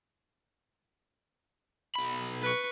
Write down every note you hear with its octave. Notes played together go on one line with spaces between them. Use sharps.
B1 B5
B4 C#6